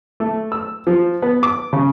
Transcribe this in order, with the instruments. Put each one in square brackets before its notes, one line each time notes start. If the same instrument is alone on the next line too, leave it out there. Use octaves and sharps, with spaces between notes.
[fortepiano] A3
E6
F3
B3
D6
C#3